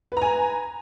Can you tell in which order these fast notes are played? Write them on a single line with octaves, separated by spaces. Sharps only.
B4 A#5 G#5